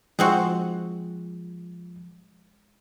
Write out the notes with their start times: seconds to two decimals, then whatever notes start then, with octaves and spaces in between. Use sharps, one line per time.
0.19 F3 G#3 C4 F#4